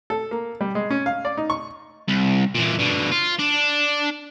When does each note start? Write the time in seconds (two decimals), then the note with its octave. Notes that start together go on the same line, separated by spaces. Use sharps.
0.10 A4
0.31 A#3
0.61 G3
0.75 G#3
0.91 C#4
1.06 F5
1.25 D5
1.37 D#4
1.50 C#6
2.08 C2
2.56 A#2 E3
2.80 B2 D3
3.12 F4
3.39 D4